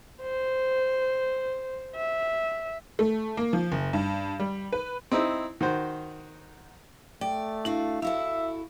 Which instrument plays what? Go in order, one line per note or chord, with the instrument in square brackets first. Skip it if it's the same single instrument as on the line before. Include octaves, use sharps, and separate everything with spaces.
[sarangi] C5
E5
[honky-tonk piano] A3
A#3
F3
F#1
G2
G3
B4
[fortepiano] C4 D#4 E4
D#3 F#4 C5
[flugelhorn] A3 [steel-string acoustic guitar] D5 [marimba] G5
[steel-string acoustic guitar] D4 F#4 F5 [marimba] E4
[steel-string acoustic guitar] E4 F#4 A4 [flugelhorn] E5 [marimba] F5